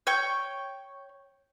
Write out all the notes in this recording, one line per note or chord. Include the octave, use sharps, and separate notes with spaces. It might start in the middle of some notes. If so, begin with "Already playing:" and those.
C#5 G5 G6